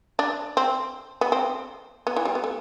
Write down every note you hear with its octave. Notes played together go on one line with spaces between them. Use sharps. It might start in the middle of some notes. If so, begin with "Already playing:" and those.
D4
C4
B3
C4
B3
E3
G3
B3
A3